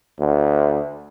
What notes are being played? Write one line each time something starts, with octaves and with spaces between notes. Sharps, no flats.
D2